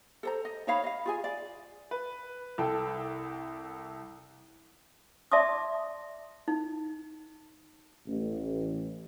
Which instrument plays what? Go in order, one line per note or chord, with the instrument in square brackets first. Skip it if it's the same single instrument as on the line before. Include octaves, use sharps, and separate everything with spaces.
[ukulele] A4 C5 A#5
D#5
D#4 C#5 F5 B5
D#5 F5
F4 G#4 G#5
D5
[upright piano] B4
C2 A4 G5
[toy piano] D5 E5 A5 C6 D6 D#6
D#4
[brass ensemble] A1